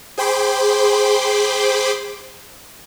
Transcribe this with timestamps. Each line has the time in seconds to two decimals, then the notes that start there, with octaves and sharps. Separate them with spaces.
0.17 G#4 C5 G5 B5 C6 D6